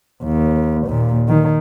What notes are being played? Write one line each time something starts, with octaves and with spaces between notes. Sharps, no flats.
D#2
D#2 A#2
D#3